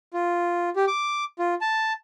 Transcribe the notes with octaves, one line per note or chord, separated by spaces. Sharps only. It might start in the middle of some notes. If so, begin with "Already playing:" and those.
F4
G4
D6
F4
A5